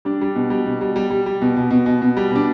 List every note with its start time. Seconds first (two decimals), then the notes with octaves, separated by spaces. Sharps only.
0.05 G3 D4
0.21 G3
0.35 B2
0.50 G3
0.66 B2
0.81 G3
0.96 G3
1.10 G3
1.26 G3
1.41 B2
1.56 B2
1.70 B2
1.86 B2
2.02 B2
2.17 G3
2.31 B2 D4